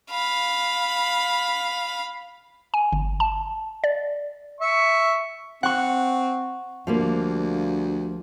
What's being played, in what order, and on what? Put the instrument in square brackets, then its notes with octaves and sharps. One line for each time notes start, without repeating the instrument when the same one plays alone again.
[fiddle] F5 B5
[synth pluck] G#5
G1
A5
D5
[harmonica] E5 C#6
[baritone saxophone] C4 [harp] F#5 C#6
[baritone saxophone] D2 [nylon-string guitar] F3 G3 A#3